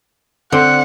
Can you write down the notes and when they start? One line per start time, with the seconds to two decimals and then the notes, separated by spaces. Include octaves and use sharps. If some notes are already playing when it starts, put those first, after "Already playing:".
0.52 D3 C4 C5 F#5